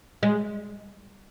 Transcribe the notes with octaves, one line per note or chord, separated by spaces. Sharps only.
G#3